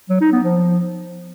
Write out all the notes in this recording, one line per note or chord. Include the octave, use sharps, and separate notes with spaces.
F#3
D#4
B3
F3